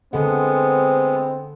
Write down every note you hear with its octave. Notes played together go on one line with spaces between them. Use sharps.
D3 G#3 B3 C4 A4 F#5